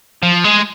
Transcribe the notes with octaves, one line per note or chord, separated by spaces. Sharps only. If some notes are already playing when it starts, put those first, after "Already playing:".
F3
G#3